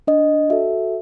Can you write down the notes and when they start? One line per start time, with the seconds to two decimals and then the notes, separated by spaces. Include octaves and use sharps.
0.07 D4 D#5
0.50 F#4 A4 E5